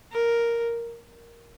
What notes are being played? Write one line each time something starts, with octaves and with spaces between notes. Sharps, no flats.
A#4